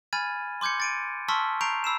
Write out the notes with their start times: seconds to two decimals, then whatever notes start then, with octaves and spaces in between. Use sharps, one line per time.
0.13 G#5 B5 F6 G#6 A6 D#7
0.61 C6 D6 G6 G#6 C#7
0.80 A6 D7 D#7
1.28 A5 C6 C#6 E6 F6 B6
1.61 A#5 C#6 G6 C7 D7 F7
1.84 B5 E6 C7 E7